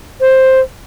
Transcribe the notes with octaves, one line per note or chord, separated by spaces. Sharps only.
C5